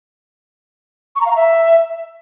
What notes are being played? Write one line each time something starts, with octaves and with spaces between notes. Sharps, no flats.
C#6
A#5
F5
A#5
E5